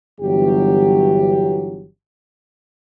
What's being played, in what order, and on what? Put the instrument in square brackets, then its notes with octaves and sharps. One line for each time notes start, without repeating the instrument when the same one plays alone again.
[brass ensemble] G1 E3 F#3 G4